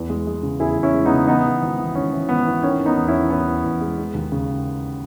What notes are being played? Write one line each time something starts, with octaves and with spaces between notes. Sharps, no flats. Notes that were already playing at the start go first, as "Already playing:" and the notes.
Already playing: E2
G#3
G#3
C#3
E2 E4 G#4
E2
C#4 E4
G#3
B3 D#4
C#3
E3 B3 D#4
E3
G#1
E3
G#1 C#4
E3
G#1 B3
E3
D#3 C#4
D#3
B3 D#4
E2
C#4 E4
D#3
E2 B3
E2
E2
G#3
G#3
D#2
C#3